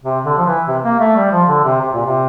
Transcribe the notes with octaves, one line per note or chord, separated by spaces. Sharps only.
C3
D3
F3
E3
C3
A#3
A3
G3
F3
D3
C3
C3
A#2
C3